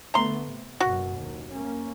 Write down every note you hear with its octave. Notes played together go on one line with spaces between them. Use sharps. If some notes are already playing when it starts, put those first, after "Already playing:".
D3 A3 B3 A#5 C6
C3
F#1 F#2 B2 F#4
F#1 D#2
A#3 C#4